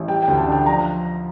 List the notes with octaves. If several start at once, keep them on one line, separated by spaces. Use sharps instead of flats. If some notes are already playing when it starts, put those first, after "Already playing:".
Already playing: A1
G3 G5
G5
D2
A5
D4 G5
F3 A#5